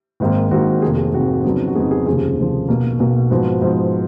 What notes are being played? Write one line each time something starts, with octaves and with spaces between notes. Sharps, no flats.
G#1 G#2 D#3 A#3
G#1 G#2 D#3 A#3 F#4
F1 F2 D#3 A#3 G#4
G#4
F1 F2 D#3 A#3 F#4
F2 C#3 F#3 B3 D#4
F#4
F2 C#3 F#3 B3 D#4 G#4
G#4
F1 D#2 C#3 F3 G#4
F1 D#2 C#3 F3
B1 B2 A#3
B1 B2 A#3 F#4
G#2 F3 B3 F#4
G#2 F3 B3